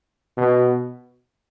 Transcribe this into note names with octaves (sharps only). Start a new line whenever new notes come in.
B2